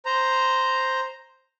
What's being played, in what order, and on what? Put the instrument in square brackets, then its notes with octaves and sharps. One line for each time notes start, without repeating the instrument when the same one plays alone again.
[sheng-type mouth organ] C5 A#5